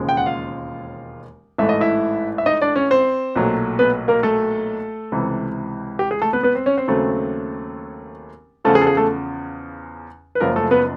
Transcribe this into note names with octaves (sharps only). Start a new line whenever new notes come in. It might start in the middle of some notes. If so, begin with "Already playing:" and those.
Already playing: E1 D#2 C#3 F3 G#3
G5
F#5
F4 F5
A1 G#2 E3 A3 E5
D#5
E4 E5
E5
D#4 D#5
D4 D5
C#4 C#5
C4 C5
B1 A#2 F#3 A3
B3 B4
A#3 A#4
A3 A4
C#2 C3 E3
G4
G#4
A3 A4
B3 B4
B3 B4
C4 C5
C#4 C#5
C4 C5
D#2 C#3 F#3 A3 C4 A4
E2 C#3 F3 A3 A4
G#4
A4
G#4
A3 A4
B4
F#1 F#2 C#3 F3 A#3 A#4
A3 A4
B3 B4